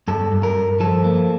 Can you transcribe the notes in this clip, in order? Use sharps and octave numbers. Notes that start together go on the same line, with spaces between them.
G2 A4
G2
A#4
G2
F3 A4
A#3